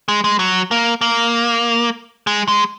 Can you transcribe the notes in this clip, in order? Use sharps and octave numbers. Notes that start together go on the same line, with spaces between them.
G#3
G#3
F#3
A#3
A#3
G#3
G#3